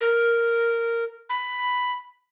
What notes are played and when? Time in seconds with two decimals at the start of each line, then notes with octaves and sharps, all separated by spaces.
0.01 A#4
1.29 B5